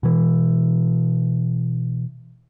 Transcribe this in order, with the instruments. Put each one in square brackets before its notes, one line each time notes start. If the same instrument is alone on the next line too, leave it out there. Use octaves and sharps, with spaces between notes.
[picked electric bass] B2 E3